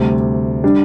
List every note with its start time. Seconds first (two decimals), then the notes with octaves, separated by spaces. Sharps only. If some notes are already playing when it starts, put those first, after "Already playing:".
Already playing: D2 C3 G3
0.64 G3 D4